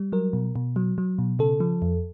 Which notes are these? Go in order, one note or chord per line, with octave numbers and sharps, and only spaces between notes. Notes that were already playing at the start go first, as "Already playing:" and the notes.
Already playing: G3
F#3 A#4
B2
B2
F#3
F#3
B2
C#3 A4
F3
F2